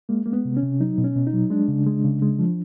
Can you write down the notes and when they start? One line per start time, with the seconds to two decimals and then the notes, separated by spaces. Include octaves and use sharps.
0.09 G#3 A#3
0.26 G#3 A#3
0.33 B3
0.45 C3
0.57 C#4
0.63 C3
0.80 F#3 D#4
0.98 B2
1.04 C#4
1.16 B2
1.27 D#4
1.33 F#3
1.50 G#3 D4
1.68 C#3
1.86 G#3
2.05 C#3
2.22 G#3
2.39 F3